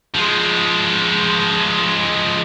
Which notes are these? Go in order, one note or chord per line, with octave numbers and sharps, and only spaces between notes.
F3 G#3